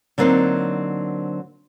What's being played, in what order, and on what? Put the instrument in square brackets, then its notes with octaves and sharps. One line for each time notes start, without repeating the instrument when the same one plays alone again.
[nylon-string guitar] D3 F#3 A#3 C4 D4 D#4